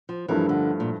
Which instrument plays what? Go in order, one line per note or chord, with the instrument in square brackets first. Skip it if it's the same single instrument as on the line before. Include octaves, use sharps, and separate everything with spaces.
[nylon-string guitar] F3
[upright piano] G2 F3 A3 E4 A#4 [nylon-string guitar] E3
[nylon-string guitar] D3
A#2